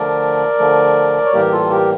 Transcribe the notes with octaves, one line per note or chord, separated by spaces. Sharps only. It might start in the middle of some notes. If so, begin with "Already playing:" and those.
Already playing: D3 F3 A3 A#4 D5
D3 F3 A3
C#5
A2 E3 G3 A#3 G4 A#4
F4 A4
G4 A#4